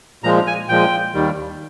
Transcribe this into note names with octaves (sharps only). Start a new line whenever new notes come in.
A#2 F3 G#3 A#5
G#5
A#2 F3 G#3 G5
D#2 D#3 G3